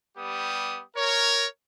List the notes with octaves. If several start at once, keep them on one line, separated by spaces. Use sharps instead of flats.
G3 B3 G4 D#6
A#4 C#5